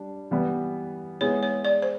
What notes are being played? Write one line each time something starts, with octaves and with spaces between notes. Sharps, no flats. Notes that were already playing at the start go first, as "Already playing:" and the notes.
Already playing: G3 D4
E3 G3 B3
G#3 B3 E4 G#4 C#5
C#5
D5
C5